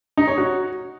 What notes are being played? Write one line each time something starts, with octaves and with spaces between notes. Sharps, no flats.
D#4
C#5
F#4